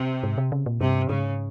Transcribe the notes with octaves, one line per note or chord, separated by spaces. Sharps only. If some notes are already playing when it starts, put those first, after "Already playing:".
Already playing: C3
G#2
C3
C#3
A#2
G2 C3
G#2 C#3